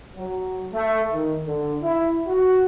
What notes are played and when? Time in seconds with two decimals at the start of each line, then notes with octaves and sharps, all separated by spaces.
0.15 F#3
0.73 A3
1.12 D#3
1.46 D3
1.82 E4
2.27 F#4